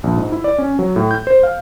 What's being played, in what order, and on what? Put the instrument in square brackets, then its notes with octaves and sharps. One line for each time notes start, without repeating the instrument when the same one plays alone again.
[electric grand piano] A#1
G#2
E4
D5
C#4
F#3
A2
G6
C5
F5